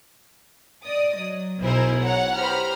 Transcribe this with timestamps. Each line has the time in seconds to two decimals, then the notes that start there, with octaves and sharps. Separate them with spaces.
0.85 D5 D#5 D#6
1.17 F#3
1.61 B1 B2 E4 G#4 A#4 C5
2.02 C#5 F#5 A#5
2.38 G4 B4 C5 A#5 B5 F6